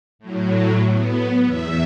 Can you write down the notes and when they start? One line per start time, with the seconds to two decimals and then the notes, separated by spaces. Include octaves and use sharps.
0.19 A2 F#3
0.90 B3
1.44 E2 E5